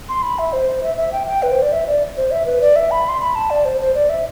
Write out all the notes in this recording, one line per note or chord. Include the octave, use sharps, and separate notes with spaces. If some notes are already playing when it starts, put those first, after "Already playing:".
C6
B5
E5
C5
E5
E5
G5
G5
B4
C5
D5
E5
D5
C5
E5
B4
D5
E5
B5
C6
B5
A5
D5
C5
C5
D5
E5